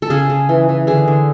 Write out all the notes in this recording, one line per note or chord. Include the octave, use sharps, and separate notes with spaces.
A4
C#3 G#4
C#3
E3
E3
D3 G#4
D3